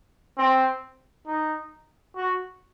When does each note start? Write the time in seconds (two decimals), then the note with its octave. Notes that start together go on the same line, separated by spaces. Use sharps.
0.38 C4
1.27 D#4
2.16 F#4